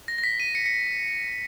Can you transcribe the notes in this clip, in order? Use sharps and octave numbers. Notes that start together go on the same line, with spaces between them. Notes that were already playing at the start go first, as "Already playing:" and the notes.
A#6
A#6
B6
D#7
C#7
C#7